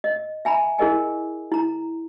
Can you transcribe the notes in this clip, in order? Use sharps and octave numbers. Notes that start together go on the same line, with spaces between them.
D#5
E5 G#5 A#5 B5
E4 G#4 A#4 D#5 G#5
E4 A#5